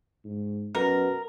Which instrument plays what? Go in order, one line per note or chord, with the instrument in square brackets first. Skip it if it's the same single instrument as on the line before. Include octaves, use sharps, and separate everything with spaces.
[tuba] G#2
[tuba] F#2 [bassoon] B2 [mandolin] A#4